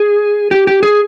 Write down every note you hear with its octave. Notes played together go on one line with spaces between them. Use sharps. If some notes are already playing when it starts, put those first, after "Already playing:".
Already playing: G#4
G4
G4
G#4